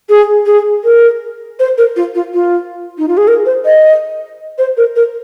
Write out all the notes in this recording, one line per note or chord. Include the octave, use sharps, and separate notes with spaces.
G#4
G#4
A#4
C5
A#4
F4
F4
F4
D#4
F4
G#4
A#4
C5
D#5
C5
A#4
A#4